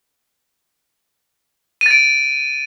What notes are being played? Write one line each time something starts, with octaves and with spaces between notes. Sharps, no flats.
A6 D7 D#7